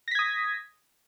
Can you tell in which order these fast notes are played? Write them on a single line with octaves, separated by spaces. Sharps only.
A#6 B6 G#6 D#6